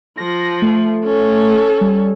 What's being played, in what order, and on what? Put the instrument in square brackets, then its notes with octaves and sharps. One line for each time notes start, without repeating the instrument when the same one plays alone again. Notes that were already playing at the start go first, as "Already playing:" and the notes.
[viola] F3 [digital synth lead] A#6
[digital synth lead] A3
[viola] C#4 A4
[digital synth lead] G3